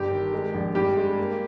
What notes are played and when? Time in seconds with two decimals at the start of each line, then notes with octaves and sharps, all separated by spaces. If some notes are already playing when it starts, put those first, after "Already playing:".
Already playing: G1 G4
0.11 D#3
0.33 G#3
0.54 A#1
0.75 G2 G4
0.97 G#3
1.18 A#3